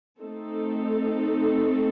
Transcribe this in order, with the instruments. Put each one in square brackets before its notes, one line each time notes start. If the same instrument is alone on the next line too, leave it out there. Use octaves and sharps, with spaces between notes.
[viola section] A3 C4 D#4 A4